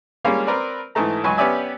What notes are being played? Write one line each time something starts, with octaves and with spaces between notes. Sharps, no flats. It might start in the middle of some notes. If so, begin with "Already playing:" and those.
G3 G#3 A#3 C#4 F4
C4 A#4 B4 D5
G#2 E3 A3 A#5
C#2 F#3 B4 G#5 C#6
B3 C#4 G4 D5 E5 G#5